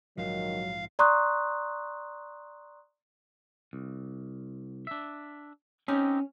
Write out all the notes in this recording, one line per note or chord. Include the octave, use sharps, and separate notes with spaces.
A#1 G#2 D#3 F3 F#3 F5
D5 A#5 C6 C#6 D#6 F#6
C2
D4 E5
C4 C#4 D#4 G4